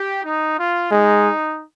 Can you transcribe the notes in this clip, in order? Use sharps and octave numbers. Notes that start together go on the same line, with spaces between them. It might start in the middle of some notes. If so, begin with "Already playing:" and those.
Already playing: G4
D#4
F4
G#3 D#4